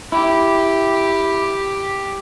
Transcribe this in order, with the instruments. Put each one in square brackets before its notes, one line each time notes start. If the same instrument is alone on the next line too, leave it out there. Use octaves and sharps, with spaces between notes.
[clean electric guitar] E4 [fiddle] G4